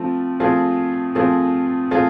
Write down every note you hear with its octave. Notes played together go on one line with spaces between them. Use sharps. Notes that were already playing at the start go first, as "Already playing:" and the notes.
Already playing: F3 A3 C4 F4
F3 A3 C4 F4 G#4
F3 A3 C4 F4 G#4
F3 A3 C4 F4 G#4